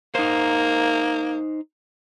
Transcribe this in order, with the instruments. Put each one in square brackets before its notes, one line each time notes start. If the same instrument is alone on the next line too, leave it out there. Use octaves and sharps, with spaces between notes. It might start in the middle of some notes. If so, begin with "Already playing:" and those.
[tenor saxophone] A#3 [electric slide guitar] D#4 C5